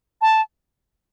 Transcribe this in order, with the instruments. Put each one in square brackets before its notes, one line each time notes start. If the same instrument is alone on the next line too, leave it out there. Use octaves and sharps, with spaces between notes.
[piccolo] A5